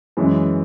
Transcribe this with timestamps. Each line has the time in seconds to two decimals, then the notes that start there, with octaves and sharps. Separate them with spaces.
0.17 F#2 E3 G#3